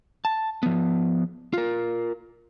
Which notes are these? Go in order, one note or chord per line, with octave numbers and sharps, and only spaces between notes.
A5
F3 B3
F4 A#4